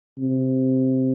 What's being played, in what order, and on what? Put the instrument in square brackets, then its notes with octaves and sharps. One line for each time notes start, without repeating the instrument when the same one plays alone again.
[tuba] C3